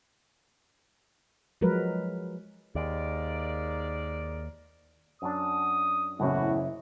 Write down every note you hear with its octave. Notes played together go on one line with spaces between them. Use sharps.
F3 F#3 G#3 A#4 B4
D#2 G#2 A#4 D5
F#2 F#3 D4 D#6
F#1 E2 A2 C#4 E4 F#4